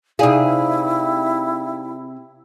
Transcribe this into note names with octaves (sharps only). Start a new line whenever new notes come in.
C3 D#4 E4 G#4 D5 F5